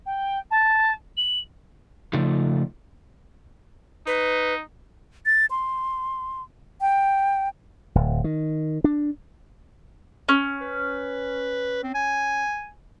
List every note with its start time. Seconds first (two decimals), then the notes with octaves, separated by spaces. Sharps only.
0.06 G5
0.51 A5
1.17 F#7
2.13 C#3 F3 A3 D#4
4.07 D#4 B4
5.26 A6
5.51 C6
6.81 G5
7.95 D1
8.24 D#3
8.84 D4
10.29 C#4
10.61 B4
11.83 C4
11.95 G#5